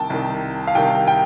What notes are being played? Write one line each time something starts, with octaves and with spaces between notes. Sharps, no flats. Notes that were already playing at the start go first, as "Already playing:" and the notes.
Already playing: C2 C3 D#3 G5 A5
C2 C3 D#3
F5
C2 C3 D#3 G5
G5